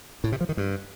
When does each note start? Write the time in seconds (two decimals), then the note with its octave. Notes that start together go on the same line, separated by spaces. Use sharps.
0.24 A2
0.32 C3
0.41 F3
0.49 D#3
0.57 G2